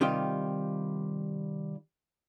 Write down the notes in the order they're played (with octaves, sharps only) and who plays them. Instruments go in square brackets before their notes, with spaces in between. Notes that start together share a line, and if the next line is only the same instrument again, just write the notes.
[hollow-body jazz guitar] C3 D#3 G3 F4